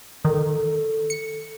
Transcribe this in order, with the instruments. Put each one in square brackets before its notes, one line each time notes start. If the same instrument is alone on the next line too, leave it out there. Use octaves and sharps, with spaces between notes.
[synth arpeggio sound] D#3 [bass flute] A4
[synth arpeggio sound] C#7